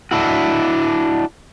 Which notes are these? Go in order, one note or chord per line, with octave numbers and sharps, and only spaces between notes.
D4 E4 F#4